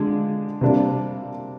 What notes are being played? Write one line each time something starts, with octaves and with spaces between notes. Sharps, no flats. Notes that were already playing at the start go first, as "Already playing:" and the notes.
Already playing: D3 G#3 D4 F4
C3 G3 A#3 D4